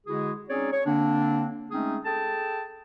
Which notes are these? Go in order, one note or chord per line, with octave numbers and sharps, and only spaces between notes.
D3 G#3 E4 F#4 G#4
C4 C#4 D#4 G#4 C#5 D5
C#5
D3 A#3 C4 D4
G#3 A3 C4 C#4 D#4 G#4
G#4 A4 G5 A5